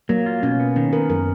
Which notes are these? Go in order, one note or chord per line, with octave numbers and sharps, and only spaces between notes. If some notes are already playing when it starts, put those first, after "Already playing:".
F#3 A#3
F4
B2 C#4
B3
D#3 C#4
B3 A#4
F#2 A#4